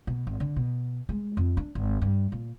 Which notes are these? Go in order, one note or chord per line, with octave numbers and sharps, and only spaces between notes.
B2
G#1
D3
B2
G#3
F2
D4
G#1
G2
A#2